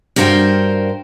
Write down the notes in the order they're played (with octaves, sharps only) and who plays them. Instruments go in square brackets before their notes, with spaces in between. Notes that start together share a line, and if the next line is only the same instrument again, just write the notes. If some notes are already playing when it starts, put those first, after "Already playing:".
[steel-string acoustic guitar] G2 F#4 A#4 C5 F5 G5